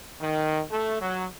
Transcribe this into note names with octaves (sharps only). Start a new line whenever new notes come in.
D#3
A3
F#3